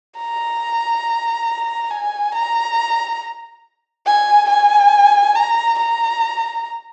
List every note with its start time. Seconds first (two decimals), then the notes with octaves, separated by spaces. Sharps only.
0.18 A#5
1.91 G#5
2.34 A#5
4.06 G#5
4.49 G#5
5.35 A#5
5.78 A#5